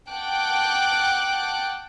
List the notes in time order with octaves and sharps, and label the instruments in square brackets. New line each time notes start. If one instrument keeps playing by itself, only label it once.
[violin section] F#5 G5 A5 D6 F#6